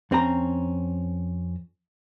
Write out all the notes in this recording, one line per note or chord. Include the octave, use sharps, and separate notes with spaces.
F2 C4 C#4 A#5